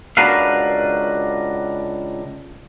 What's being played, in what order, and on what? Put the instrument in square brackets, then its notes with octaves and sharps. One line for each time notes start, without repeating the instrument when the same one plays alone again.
[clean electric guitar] C#2 D4 F#4 A#4 B4 F5